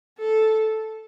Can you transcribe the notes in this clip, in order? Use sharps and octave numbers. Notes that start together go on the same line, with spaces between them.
A4